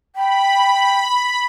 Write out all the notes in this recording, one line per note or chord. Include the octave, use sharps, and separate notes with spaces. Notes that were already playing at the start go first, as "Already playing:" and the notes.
G5 B5